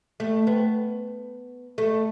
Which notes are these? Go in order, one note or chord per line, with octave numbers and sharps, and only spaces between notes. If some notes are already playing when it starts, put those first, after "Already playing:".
A3
B3
A3